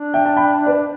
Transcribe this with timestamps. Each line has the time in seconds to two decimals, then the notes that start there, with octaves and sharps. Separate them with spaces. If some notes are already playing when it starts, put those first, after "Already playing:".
Already playing: D4
0.14 E5 G5
0.25 A5
0.37 G5 B5
0.67 B4 D5